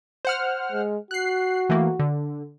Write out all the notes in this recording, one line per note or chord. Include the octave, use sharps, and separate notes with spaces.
C5 F#5 F6
G#3
F#4 F#6 C7
E3 A3 A#3
D3